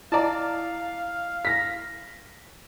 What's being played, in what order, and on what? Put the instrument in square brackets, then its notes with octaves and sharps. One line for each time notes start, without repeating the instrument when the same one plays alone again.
[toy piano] E4 A#5 [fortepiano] D5 A5 [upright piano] D#5 [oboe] F5
[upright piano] A#6 B6